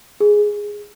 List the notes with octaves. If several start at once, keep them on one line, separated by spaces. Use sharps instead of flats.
G#4